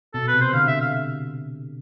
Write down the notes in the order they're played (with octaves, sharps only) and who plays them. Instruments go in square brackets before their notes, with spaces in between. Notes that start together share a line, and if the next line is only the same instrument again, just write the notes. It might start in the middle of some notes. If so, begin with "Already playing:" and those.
[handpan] B2 [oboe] A4
[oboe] B4
[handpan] C3
[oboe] C5
[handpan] D3 [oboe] F5
[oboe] E5
F5